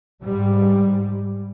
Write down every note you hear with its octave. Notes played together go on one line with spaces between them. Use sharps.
G#2 G3